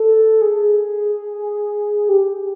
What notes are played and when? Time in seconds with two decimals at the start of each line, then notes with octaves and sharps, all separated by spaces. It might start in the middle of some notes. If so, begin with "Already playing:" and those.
Already playing: A4
0.42 G#4
2.09 G4